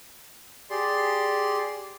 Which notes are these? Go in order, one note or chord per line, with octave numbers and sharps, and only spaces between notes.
G4 G#4 D5 C6